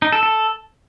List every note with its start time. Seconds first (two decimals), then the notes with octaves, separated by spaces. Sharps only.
0.02 D#4
0.12 A4
0.23 A4